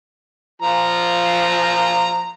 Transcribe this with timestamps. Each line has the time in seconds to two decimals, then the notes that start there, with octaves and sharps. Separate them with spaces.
0.62 F3 F4 A#5